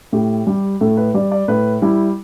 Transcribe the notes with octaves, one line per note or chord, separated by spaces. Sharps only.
A2 G4
G3
A2 A4
B4
G3 D5
D5
A2 B4
G3 E4